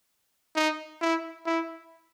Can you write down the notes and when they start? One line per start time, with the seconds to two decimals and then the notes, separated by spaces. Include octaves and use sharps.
0.56 D#4
1.01 E4
1.46 E4